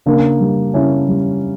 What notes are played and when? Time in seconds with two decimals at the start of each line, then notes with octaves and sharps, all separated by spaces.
0.06 C#3 A#3 D4
0.40 G3
0.74 C#3 C#4 E4
1.08 G3